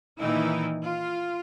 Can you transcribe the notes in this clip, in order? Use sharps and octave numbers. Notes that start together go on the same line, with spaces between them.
A#2 D#3 E3 D#4 E4
F4